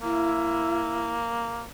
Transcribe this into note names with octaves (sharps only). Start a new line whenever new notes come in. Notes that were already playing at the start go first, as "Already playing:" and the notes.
A#3 E4